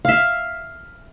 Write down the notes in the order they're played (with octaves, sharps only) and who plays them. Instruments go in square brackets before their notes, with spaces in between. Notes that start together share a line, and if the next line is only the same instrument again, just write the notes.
[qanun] E5 F5